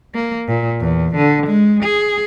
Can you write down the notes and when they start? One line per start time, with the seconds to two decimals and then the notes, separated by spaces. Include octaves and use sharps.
0.14 A#3
0.47 A#2
0.80 E2
1.16 D3
1.46 G#3
1.83 G#4